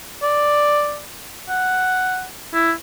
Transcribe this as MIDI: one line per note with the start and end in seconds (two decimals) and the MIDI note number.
0.23 1.02 74
1.49 2.24 78
2.54 2.72 64